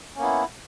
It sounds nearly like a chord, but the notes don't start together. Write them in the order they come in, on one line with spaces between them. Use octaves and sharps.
C#4 A#3 B3 E4